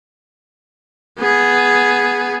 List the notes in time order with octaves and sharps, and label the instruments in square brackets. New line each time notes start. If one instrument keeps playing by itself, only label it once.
[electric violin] B3 G#4